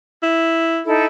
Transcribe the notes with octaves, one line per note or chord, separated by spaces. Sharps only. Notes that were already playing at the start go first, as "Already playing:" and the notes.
E4
D#4 E4 A4